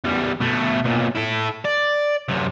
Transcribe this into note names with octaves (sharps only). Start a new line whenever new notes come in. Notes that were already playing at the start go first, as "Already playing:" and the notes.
E2 G3
B2 A3
B1 A#2
E4 A4
D5
F#2 C3